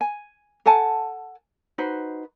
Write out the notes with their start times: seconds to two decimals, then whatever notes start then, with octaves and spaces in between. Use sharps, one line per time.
0.01 G#5
0.66 A4 F#5 G#5 A5
1.78 D#4 F#4 B4 C5